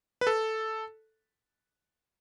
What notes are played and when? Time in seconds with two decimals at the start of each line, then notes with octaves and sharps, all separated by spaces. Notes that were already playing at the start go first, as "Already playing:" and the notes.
0.21 B4
0.27 A4